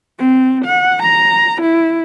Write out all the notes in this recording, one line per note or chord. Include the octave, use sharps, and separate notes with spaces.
C4
F#5
A#5
E4